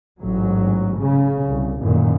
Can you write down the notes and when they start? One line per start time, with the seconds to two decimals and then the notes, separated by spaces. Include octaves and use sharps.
0.20 A1 G#2 F#3
0.99 C#3
1.48 C2
1.82 A1 F#2 A#2 D#3